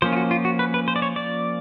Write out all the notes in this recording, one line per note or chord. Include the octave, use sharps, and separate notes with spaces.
F3 A#3 C#4 C5
F4
F#4
F4
F#4
B4
B4
C5
D5
C#5
D5